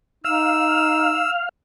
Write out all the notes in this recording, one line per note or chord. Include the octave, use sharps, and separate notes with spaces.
D#4 F5 E6